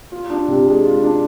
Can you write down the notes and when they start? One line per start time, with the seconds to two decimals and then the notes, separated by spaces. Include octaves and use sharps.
0.12 F4
0.30 D4
0.48 C3
0.67 G#3
0.85 F4
1.03 D4